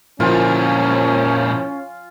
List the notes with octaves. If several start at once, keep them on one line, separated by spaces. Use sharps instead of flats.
A#2 F3 C4 C#4 E4 F4 A#4 G#5